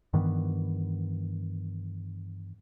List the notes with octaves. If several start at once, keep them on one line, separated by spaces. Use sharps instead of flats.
G2 D#3 E3 B3